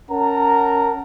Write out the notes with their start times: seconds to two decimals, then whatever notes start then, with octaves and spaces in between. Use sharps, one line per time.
0.11 C#4 A#4 F#5 A5 A#5